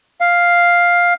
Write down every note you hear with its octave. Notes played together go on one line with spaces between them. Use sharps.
F5